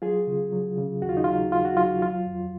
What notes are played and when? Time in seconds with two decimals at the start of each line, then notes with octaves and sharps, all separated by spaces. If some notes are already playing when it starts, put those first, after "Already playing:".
0.02 F#3 F4 G#4
0.27 C#3
0.52 F#3
0.78 C#3
1.02 D#2 F#4
1.09 F4
1.17 D#4
1.24 F#3 F4
1.52 D#2 F4
1.65 F#4
1.77 F#3 F4
2.02 F#3 F4
2.27 F2